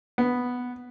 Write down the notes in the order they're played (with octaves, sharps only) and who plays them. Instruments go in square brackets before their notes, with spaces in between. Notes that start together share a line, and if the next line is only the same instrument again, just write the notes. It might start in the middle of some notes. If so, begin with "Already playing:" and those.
[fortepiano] B3